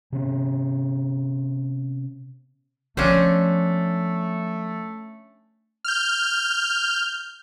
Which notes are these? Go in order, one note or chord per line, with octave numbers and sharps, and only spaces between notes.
C3 B3 C#4
F3 A3 B3 C#4 D4 C5
F6 G6